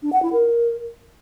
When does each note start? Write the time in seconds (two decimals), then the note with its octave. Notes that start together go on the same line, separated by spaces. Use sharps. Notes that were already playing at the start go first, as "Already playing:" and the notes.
0.03 D4
0.12 F#5
0.22 E4
0.32 A#4